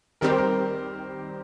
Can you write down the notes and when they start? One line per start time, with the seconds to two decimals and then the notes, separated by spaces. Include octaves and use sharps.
0.21 D#3 G3 C4 G4 A#4
0.30 C5
0.38 A#4